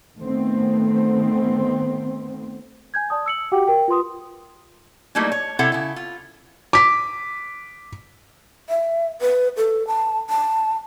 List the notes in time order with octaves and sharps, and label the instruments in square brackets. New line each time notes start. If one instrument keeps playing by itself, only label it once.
[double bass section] D#3 A3 B3 C4
[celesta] G#5 G6 G#6
D5 A5 D#6
E6 C#7 F#7
F#4 G4 F#5 G5 D6
A#4 G5
F4 B4 C6 D#6
[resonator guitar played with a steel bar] F#3 G3 A3 A#3 D#4 E4
C#5
C3 E4 A4 C#5 E5 F#5
C#3 E4
F4
[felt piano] D6 B6
[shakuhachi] E5
B4
A4
A5
A5